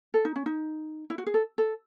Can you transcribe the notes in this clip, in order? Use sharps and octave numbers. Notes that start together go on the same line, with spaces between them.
A4
D#4
C#4
D#4
E4
F#4
G#4
A4
A4